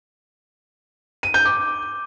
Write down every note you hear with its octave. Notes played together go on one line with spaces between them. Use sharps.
D#7
G6
D6